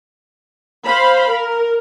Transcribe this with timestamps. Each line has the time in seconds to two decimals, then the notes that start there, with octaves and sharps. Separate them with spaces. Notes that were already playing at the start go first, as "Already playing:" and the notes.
0.85 C5 F5 B5
1.32 A#4